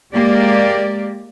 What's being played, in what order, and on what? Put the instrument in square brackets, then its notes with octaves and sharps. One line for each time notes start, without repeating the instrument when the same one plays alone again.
[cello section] G#3 A#3 G4 D5